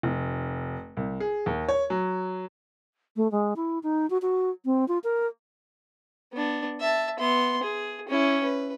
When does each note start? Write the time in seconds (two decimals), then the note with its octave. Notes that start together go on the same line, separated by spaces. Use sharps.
0.03 F1
0.97 C2
1.20 G#4
1.46 D#2
1.68 C#5
1.90 F#3
3.16 A3
3.32 G#3
3.56 E4
3.83 D#4
4.10 F#4
4.22 F#4
4.65 C4
4.88 F4
5.04 A#4
6.33 B3 D4
6.80 E5 A5
7.19 B3 C6
7.63 G#4
8.08 C#4 E4
8.44 B4